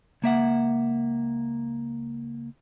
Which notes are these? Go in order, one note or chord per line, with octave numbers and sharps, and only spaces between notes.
C#2 A#3 E5 F#5